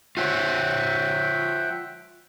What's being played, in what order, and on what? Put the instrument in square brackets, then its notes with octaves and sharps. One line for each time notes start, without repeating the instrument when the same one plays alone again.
[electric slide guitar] F4 C5 C#5 [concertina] E5 F#5 G5